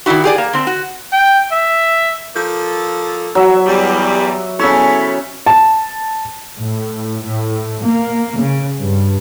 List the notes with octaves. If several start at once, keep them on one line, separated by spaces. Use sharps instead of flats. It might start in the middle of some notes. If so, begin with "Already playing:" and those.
D#3 E3 D4 E4 F#4
G4 G#4 D5
A#3
D3 C4
F#4
G5
E5
F3 A#3 A4
F#3 E5
E2 G3
C#3 E4 A4 C#5
A5
A2
A2
A#3
C#3
G2